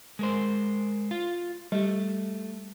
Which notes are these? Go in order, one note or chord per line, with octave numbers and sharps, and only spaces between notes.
G#3 A#4 C5
F4
G3 A3 G4